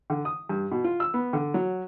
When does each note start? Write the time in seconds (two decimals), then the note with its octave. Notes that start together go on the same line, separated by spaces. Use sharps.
0.10 D3
0.25 D#6
0.49 G2
0.71 B2
0.84 F4
1.00 E6
1.14 B3
1.33 D3
1.54 F#3